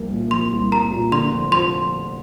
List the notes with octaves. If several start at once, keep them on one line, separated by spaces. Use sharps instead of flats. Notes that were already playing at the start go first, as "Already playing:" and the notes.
Already playing: C2 F3 A#3
A#2
F3 C6
C2
A#3 A#5
A#2
D3 C6
F1
F3 C6